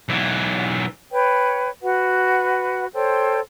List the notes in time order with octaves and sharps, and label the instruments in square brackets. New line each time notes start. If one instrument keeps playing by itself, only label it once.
[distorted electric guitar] B1 E3
[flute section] B4 C#5 G5
F#4 B4 F#5
A4 C5 C#5 G5